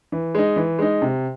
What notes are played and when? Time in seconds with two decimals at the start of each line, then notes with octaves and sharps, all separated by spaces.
0.12 E3
0.35 G#3 D#4
0.56 E3
0.79 G#3 D#4
1.02 C3